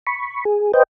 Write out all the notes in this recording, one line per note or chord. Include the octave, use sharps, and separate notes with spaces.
B5 C#6
G#4
B4 C5 D#5 G5